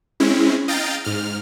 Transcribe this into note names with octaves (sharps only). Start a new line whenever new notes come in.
G#3 C4 C#4 E4
D#5 F5 G5 A#5 A6
G#2 F6